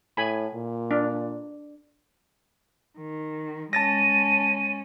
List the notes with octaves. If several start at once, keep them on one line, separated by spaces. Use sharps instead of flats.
A2 G#5 B5
A#2
D4
D#3
G#3 C#4 A5 A6 A#6 D#7